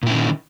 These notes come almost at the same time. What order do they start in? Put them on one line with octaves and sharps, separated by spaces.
A#2 E4 C#4 D#3